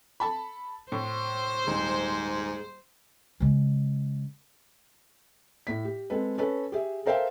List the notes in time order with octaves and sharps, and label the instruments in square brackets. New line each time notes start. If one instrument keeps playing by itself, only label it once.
[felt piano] A4 A5 B5
[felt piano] A2 [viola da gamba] C5
[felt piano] D#1 [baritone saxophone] G#2
[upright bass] C#3 G#3
[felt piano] A2 B6
G4
G#3 C4 A4 B4
C#4 A4 B4
G4 G#4 E5
A4 A#4 C5 E5 F5 G5